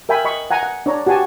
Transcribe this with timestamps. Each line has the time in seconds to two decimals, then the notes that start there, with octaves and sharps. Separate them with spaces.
0.09 A#4 E5 G5 G#5 B5
0.25 D#5 B5 C#6
0.51 F#5 G#5 A#5
0.63 F#5
0.86 D4 C#5 A#5
1.07 F#4 G4 F#5 G#5 A5